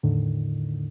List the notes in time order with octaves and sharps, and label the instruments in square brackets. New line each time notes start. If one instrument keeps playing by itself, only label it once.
[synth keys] E2 A2 D3 D#3